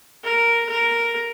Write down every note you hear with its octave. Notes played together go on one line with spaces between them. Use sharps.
A#4
A#4